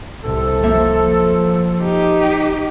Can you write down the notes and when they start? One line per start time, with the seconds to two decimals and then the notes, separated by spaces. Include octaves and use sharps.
0.23 C2 C3 A4
0.63 F3 A#3 C5 E5
1.82 D#4 G4